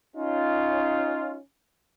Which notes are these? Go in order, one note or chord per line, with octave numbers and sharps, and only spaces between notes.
C#4 D#4 F4